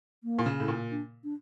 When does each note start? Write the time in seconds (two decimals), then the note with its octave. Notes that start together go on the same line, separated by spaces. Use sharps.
0.24 A#3
0.39 A#2
0.46 C#3
0.60 A2
0.68 A#2
0.91 D4
1.24 D4